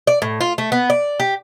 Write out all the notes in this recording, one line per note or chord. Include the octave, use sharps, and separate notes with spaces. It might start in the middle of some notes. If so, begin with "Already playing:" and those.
D5
A2
F4
A3
B3
D5
G4